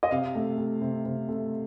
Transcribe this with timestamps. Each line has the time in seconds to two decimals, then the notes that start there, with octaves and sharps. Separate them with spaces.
0.03 D#5
0.11 C3 F5
0.35 A3
0.58 A3
0.81 C3
1.05 C3
1.28 A3